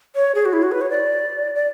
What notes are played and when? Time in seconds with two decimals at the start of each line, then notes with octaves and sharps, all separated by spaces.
0.15 C#5
0.35 G#4
0.45 F#4
0.53 E4
0.63 F#4
0.72 B4
0.81 C#5
0.90 D5
1.55 D5